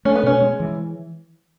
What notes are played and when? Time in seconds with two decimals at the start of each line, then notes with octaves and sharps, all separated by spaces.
0.05 A3 C#4
0.15 B3
0.23 B2 C#4
0.42 G#3
0.60 E3